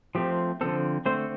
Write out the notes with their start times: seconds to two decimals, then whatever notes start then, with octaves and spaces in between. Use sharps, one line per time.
0.15 F3 A3 C4 G4
0.61 D3 F3 C4 A4
1.06 D3 A3 C4 C5